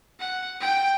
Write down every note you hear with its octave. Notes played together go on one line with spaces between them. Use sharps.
F#5
G5